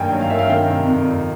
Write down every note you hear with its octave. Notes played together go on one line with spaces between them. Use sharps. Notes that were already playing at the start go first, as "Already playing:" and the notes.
Already playing: G2 D#3 F#3 A#3 F5 G5 G#5
F#3
F5
D#3 E5
F5
D#3 G5
C3
F2
F2